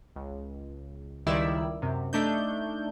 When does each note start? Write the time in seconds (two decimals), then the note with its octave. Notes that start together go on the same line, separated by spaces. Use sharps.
0.16 C#2
1.27 C#2 D#3 G3 E4 D5 E6
1.82 F#2 C3
2.13 A3 D4 D#4 G6